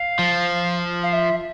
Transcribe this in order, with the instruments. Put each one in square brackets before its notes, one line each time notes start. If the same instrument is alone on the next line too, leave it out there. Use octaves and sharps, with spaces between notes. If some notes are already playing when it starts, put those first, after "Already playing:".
Already playing: [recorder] F5
[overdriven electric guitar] F3
[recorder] F5
E5